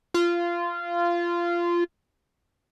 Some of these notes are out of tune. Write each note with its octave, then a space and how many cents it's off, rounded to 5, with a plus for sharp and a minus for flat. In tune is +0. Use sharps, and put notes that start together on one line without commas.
F4 -15